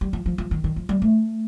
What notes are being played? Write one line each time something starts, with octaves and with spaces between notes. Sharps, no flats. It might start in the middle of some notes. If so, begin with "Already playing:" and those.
G3
F3
F3
F3
D#3
D#3
F3
G3
A3